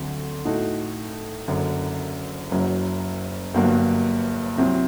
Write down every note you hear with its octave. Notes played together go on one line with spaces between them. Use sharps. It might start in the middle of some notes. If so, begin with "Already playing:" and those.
Already playing: D2 D3 F#3 C4
A2 A3 D#4 F#4
F#1 F#2 D3
F#1 F#2 F#3
G1 G2 F#3 A#3 F#4
C2 C3 F#3 C4